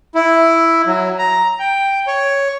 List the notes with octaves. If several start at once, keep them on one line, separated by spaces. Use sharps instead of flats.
E4
F#3
A#5
G5
C#5